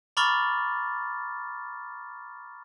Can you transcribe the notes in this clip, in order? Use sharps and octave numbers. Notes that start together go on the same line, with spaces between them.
A#5 B5 C#6 D6 F6 A6